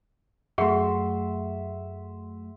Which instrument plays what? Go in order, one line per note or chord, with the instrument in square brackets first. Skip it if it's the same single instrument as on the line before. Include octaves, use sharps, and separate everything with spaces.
[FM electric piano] F#2 F#3 A3 [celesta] G#4 F#5 C#6 [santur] E5 C6